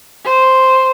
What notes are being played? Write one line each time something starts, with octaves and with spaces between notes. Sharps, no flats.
C5